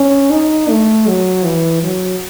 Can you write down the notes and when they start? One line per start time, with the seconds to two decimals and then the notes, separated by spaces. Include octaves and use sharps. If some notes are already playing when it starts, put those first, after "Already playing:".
Already playing: C#4
0.32 D#4
0.70 A3
1.08 F#3
1.45 E3
1.83 F#3